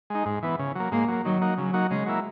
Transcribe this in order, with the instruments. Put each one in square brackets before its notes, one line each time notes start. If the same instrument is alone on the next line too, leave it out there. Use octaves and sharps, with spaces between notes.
[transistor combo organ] G#3 D#4
G#2
E3 B3
C#3
F#3 A#3
[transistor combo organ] G#2 [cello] A#3
[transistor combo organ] F#3 A#3
[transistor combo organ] D#3 [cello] F#3
[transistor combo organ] A#3 D#4 F#4
[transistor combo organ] C#3 [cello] F#3
[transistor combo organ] F#3 A#3 D#4 F#4
[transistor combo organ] C#3 [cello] G#3
[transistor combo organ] F#3 A#3 E4